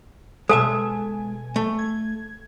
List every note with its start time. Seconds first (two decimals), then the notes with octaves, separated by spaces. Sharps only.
0.49 B2 G#3 A4 E5 G#5 A5
1.56 A3
1.79 G#6